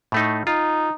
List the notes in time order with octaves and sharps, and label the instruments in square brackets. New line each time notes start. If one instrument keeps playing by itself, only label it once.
[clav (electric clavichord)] A2 A3 D#4
[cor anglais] D#4 [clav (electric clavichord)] F4